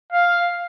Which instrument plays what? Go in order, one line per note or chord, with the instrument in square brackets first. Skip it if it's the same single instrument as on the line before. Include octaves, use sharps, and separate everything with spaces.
[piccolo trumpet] F5